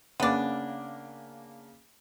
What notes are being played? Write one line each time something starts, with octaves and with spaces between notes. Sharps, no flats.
C#3 A#3 B3 D4 D6